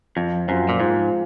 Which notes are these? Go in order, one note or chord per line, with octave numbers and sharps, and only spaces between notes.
F2 F3
F#2 C4 F4
A#2
G#2 F3